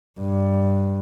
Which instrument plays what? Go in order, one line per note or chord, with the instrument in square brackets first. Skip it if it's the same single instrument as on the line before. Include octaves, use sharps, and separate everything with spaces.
[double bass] G2